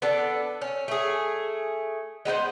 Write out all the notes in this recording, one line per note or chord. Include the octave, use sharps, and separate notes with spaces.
B3 D4 A4
C#4
A3 G#4
G#3 B3 E4 C5